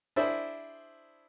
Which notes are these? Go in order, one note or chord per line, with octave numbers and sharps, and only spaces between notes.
D4 E4 G#4 C5 E5